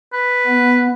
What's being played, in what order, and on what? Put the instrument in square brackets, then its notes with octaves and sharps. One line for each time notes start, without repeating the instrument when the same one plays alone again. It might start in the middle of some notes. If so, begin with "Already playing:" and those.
[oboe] B4
[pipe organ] B3